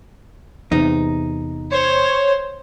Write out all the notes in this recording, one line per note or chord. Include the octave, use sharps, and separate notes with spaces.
E2 C3 D#4
C5 C#5